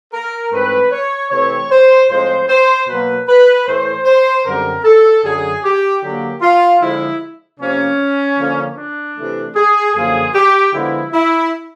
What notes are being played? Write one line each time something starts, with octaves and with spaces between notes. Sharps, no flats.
A#4
G#2 E3 A3 C4 B4
C#5
C3 E3 A3 C4 C#5
C5
A2 F3 G#3 C4 C5
C5
B2 F#3 A#3 B4
B4
A2 E3 A3 C5
C5
F#2 D3 G3 C4 A#4
A4
F#2 D3 F#3 G#4
G4
D3 F#3 A#3 G4
F4
D3 F3 G#3 E4
C3 F3 A#3 C#4
D3 F3 A#3
D4
C3 E3 A3
G#4
F#2 D3 F3 A#3 G#4
G4
D3 F3 G#3 B3 E4
E4